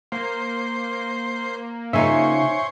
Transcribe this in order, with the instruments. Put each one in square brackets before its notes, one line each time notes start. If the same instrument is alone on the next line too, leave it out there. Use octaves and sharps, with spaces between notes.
[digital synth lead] A#3 [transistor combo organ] C5
[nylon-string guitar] C#3 D#4 F4 [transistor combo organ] C5 C#5 [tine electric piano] E5 G#5